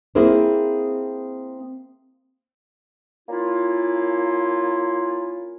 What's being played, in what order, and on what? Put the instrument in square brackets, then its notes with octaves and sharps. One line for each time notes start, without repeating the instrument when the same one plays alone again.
[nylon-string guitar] A#3 C4 E4 G#4 A#4 C5
[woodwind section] A#3 C#4 E4 F4